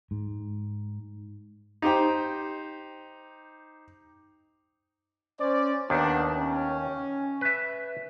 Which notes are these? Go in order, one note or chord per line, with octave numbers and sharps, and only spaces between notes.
G#2
D#4 G4 C5 G5
C#4 C5 D5
D#2 D#3 B3 D4
C#4
B4 E5